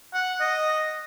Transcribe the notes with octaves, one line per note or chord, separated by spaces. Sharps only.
F#5
D#5